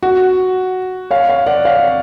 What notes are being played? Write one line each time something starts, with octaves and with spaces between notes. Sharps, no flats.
F#4
C#5 F5
C#5 F5
D5 F#5
C#5 F5